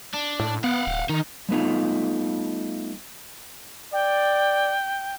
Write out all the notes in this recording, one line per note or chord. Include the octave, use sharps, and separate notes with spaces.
D4
A2
B3 F5 F#5
D1
D#3 D#4
G3 A3 B3 D#4 F4
D5 G5